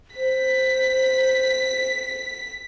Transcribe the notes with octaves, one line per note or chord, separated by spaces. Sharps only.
C5 B6